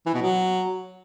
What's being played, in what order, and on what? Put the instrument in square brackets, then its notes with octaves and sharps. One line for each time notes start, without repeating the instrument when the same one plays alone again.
[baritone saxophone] E3
B2
F#3